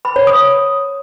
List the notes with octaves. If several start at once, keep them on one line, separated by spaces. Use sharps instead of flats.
B5
C#5
D#6